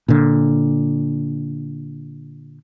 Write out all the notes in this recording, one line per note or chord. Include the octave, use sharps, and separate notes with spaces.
A#2 D3